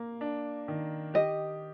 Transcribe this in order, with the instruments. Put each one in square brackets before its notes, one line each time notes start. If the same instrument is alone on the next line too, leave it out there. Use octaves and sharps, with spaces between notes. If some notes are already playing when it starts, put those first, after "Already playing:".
Already playing: [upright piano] A#3
D4
D#3
[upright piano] G4 [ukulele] D#5